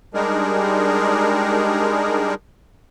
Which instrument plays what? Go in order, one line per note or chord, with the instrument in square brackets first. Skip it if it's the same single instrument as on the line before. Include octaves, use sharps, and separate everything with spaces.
[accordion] G3 G#3 D4 D#4 G#4 A#4